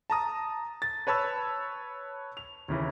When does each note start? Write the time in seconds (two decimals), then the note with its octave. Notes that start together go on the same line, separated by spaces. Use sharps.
0.10 A5 A#5 D#6
0.82 A6
1.07 B4 C#5 A5 B5 E6
2.37 F7
2.68 D#2 C#3 E3